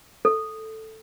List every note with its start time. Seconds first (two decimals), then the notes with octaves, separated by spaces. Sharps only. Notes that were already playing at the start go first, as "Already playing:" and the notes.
0.25 A4